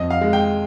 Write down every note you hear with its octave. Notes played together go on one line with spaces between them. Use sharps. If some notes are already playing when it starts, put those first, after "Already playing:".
Already playing: F2 D#5
F5
G#3
G5